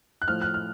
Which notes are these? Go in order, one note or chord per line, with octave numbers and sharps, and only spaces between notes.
F#6
A2 F3 F6
F#6
F6